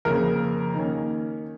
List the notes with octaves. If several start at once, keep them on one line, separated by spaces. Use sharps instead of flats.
F2 C#3 A#3 A#4
D#3 A#3 C#4